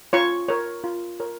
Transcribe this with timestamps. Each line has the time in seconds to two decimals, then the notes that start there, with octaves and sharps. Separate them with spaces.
0.13 F4 C#5 C#6
0.48 A#4 C#5
0.84 F4
1.20 A#4 C#5